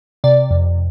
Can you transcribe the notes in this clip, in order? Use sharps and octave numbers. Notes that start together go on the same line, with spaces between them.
C3 D5
F2